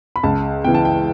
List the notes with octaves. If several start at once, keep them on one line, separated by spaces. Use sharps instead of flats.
B5
C#2 A5
C#3 E3 G5
A5
G5